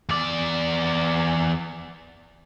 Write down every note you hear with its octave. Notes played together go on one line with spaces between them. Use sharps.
E2 D5